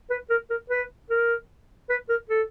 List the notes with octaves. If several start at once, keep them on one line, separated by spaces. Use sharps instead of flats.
B4
A#4
A#4
B4
A#4
B4
A#4
A4